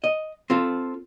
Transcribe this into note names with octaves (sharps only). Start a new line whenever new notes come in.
D#5
C4 F4 A4